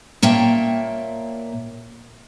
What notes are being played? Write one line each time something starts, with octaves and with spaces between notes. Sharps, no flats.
A#2 A#3 C#5 E5 G5 A5